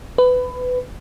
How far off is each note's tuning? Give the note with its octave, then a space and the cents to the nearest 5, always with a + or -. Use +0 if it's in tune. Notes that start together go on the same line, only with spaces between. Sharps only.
B4 +20